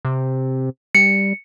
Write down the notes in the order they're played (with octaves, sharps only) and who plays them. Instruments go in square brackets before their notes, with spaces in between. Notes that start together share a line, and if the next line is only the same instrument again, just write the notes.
[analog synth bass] C3
[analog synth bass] G3 [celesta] C#7